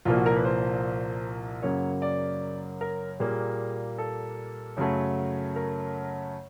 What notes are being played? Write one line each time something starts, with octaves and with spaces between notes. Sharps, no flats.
C2 A#2 F3 A#3 F4
F#4
A#4
B4
C5
F#2 C#3 F#3 A#3 C#5
D5
A#4
A#2 G3 A#3 G#4
A4
F#2 C#3 F#3 A3
A#4